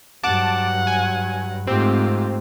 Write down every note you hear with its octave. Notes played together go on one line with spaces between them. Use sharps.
G2 F#3 F#5 A5 D6
G#5
G#2 A3 C4 F4 G4